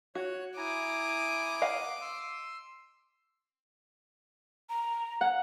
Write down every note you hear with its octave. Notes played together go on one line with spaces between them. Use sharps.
F#4 C#5 F#6
E4 G#5 A#5 D6 D#6
D#5 F5 F#5
C6 E6
A#5
F#5